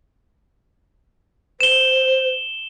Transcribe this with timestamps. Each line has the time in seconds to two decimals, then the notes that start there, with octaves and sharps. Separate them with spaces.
1.61 C5 E7 G7